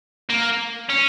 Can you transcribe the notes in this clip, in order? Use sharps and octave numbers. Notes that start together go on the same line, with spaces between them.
A#3
C#4